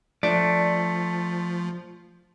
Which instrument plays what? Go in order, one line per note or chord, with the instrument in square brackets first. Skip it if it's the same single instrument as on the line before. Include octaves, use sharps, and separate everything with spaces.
[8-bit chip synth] F3 [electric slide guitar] A3 [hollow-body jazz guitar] D4 D5